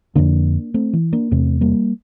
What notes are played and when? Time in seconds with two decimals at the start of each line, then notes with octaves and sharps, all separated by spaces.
0.15 F2 D3 A#3 D4
0.74 A3 C4
0.93 E3
1.12 A#3 D4
1.31 E2 C3 A3 C4
1.61 G3 A#3